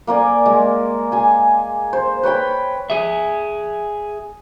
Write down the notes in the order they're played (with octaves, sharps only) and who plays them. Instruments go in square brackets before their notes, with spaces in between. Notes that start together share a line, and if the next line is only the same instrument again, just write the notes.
[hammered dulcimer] A#3 A#4 D5 G#5
G#3
G#4 G#5
C5
B4 C#5 G5 B5
[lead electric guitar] G#4 E5